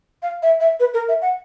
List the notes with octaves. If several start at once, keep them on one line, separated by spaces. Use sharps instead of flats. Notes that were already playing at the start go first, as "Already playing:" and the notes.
F5
E5
E5
B4
A#4
E5
F#5